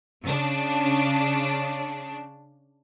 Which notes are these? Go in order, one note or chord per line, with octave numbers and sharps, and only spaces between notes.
C#3 D4